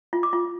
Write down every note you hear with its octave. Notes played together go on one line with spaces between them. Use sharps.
F4
D6
F4